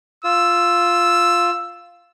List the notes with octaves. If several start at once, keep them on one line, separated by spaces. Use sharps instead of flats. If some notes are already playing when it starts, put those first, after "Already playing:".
F4 E6